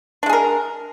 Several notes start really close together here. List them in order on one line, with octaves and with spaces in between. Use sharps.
D4 G#3 G#4 A#4